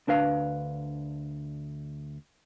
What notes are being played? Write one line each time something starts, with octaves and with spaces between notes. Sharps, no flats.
D2 D4 B4 F5